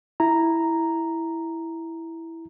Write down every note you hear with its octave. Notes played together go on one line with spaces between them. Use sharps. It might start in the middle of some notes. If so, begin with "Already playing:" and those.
E4 A#5